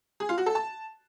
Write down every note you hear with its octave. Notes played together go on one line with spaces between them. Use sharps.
G#4
F4
F#4
A4
A5